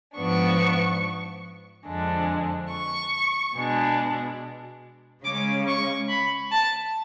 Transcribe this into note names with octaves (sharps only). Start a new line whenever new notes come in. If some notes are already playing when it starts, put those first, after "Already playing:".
G#2 F3 B3 D4 C#6
F2 D3 G#3 D4
C#6
B2 G#3 D4
C#3 G#3 C#4 D6
C#6
B5
A5